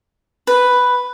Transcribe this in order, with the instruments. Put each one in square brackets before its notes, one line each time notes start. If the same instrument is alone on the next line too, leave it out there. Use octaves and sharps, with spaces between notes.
[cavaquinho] B4